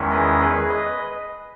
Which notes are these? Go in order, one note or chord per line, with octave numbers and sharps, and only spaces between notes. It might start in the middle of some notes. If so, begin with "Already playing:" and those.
Already playing: E2 D#3 G#3 C#4 E4
B4 D#5
G#4 B4
B4 D#5